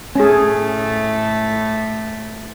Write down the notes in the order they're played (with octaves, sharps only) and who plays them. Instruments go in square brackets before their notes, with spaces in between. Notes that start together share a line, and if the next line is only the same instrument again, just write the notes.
[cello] A2 A3 [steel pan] C#4 G#4